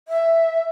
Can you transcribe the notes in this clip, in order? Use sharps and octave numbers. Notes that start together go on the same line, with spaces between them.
E5